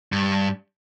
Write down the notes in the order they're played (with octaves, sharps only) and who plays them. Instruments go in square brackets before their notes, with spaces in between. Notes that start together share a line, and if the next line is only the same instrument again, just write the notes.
[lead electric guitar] G2